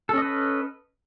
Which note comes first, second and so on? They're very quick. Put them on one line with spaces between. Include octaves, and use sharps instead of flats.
A4 C#4 D#5 B4